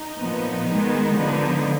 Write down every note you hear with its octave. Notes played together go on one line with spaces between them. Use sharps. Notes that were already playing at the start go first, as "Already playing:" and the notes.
Already playing: D#4
A#2 F3 B3
D#3 G#3 B3
D3 F3 B3 D#4